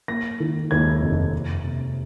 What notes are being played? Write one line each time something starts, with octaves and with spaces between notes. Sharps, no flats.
A#3 A#6
D#3
D#2 G#6
F1
F1
C3